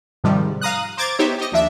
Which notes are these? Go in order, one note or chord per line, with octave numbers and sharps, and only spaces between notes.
G#2 C3 D#3 F3 G3
F5 A#5 D#6 F#6
C5 A#5 D6 G#6 A6
B3 D#4 G4 C5 C#5 E5
G4 D#5
D#2 F3 D4 E5